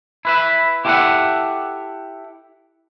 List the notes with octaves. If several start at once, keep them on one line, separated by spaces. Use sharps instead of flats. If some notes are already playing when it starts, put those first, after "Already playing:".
E4 B4 E5
E4 G4 A4 C#5 E5 F#5